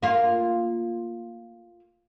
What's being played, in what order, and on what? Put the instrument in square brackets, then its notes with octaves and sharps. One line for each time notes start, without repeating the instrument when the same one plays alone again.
[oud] A#3 F4